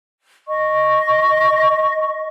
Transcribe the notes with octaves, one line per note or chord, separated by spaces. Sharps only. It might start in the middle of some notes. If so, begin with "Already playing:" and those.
D#5 C#6